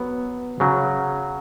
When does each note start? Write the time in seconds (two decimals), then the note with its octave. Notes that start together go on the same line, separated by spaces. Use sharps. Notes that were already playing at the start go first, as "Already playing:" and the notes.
Already playing: F#3 B3
0.60 C#3 F#3 C#4